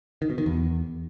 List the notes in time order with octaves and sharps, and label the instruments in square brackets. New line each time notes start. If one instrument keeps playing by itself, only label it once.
[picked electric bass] D#3
B2
D#3
E2